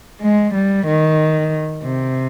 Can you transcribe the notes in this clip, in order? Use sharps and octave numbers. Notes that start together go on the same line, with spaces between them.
G#3
G3
D#3
C3